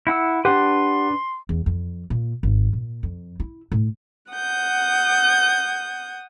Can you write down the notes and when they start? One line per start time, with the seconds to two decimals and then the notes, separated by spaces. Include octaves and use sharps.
0.07 E4 F#5 E6
0.45 D4 G4 B4 F#5 C6
1.49 E2
1.66 F2
2.10 A#2
2.43 G#1
2.73 A#2
3.03 F2
3.40 E4
3.72 A2
4.33 F#5 D#6 G6